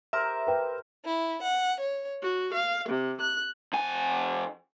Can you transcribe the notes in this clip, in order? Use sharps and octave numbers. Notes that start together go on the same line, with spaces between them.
G4 A#4 C5 E5
B4 G5
E4
F#5
C#5
F#4
F5
C3
F#6
F2 G#5